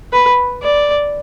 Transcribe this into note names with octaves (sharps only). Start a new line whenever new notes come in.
B4
D5